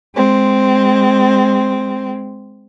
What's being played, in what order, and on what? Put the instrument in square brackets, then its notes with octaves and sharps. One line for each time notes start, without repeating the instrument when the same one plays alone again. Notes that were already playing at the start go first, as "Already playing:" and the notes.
[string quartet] G#3 C4